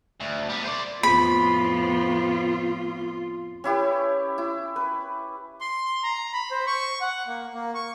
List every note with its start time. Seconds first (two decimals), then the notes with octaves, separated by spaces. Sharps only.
0.21 D2
0.49 G3 B3
0.65 C5 D5
1.03 F2 A2 B3 F4 B5
3.64 C#4 E4 G4 B4
4.38 E4
4.76 B4
5.61 C6
6.03 A#5
6.33 B5
6.51 C5
6.67 C#6
7.01 F#5
7.27 A#3
7.54 A#3
7.75 C#6